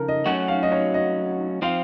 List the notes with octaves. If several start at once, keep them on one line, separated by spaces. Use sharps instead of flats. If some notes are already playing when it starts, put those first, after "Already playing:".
Already playing: C#3 F3 A4 A#4
D#5
F#3 A3 C#4 F#4 F#5
F5
D#5
C#5
D#5
F3 C4 F4 F5